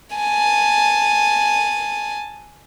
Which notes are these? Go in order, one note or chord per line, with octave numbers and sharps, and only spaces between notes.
G#5 A5